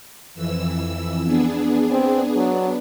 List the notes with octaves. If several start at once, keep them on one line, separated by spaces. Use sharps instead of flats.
F2 E3 E6
B3 D4 G#4
C4
F#3 B3 D4